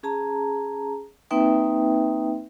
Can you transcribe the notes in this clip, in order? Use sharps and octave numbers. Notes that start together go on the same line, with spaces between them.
C#4 G#4 A5 A#5
A#3 C4 D#4 B4 E5 G5